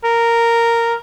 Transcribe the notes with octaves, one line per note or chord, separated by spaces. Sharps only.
A#4